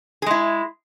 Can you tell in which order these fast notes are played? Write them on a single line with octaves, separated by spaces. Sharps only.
G#4 G#3 E4